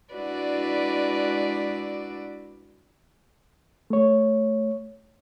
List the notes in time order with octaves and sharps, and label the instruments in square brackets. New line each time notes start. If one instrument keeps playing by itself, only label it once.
[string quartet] G#3 D4 E4 F#4 B4 D5
[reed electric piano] A3 C#5